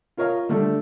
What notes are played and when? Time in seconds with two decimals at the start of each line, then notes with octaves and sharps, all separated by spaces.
0.17 F4 A#4 C#5 D#5 F5
0.49 D3 G3 A3 D4